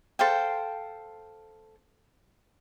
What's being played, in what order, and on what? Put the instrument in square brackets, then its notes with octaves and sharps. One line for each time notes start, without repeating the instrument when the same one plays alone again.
[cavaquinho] A4 C5 F5 G5